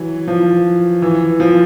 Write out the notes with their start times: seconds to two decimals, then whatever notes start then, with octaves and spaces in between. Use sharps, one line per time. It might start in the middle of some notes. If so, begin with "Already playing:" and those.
Already playing: E3 F#3
0.28 F3
1.02 E3
1.40 F3